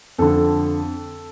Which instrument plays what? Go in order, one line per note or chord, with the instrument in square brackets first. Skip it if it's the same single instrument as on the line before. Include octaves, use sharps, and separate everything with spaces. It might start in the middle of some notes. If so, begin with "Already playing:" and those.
[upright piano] F2 D3 A4